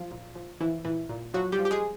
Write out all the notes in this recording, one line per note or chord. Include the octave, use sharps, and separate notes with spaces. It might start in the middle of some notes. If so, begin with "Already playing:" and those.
Already playing: F3 F4
A#2
F3
E3 F3 E4
A#2 E3 E4
A#2
F3 F#3 F#4
G3 G4
F3
G4
G#3 G#4